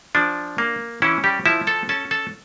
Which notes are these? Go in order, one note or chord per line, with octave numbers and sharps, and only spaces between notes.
F3 D4
A#3
E3 C#4 E4
G3 G4
F3 E4 E5
A4 A5
C#4 A4 A5
A4 A5